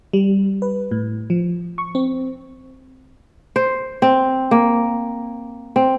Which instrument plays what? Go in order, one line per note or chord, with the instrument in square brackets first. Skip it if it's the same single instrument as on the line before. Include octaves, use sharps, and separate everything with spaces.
[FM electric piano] G3
B4
A2
F3
C#6
C4
[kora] C5
C4
A#3
C4